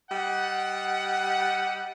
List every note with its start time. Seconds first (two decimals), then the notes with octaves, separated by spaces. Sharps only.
0.11 G3 D#5 F#5